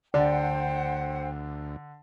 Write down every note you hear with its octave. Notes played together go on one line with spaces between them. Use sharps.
D2 D3 C5 D5 F#5 G5